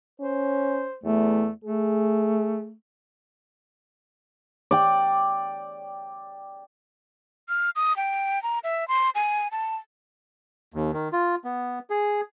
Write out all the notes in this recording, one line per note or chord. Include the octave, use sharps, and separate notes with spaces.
C#4 C5
E2 A3
A3 G#4
D5 G5
F6
D#6
G5
A#5
E5
C6
G#5
A5
D#2
D#3
F4
B3
G#4